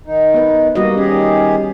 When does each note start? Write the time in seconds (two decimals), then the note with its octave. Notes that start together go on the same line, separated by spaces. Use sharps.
0.06 D#3 D#4
0.34 B3 B4
0.75 G3 A#3 F#4 D#5
0.97 D#3 C#4 G4 G#4